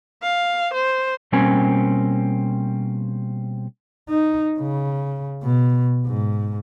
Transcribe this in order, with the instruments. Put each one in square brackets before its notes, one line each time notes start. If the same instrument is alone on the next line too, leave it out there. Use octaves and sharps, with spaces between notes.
[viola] F5
C5
[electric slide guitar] B2 G3 A#3 C4 C#4 G#5
[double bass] D#4
C#3
B2
G#2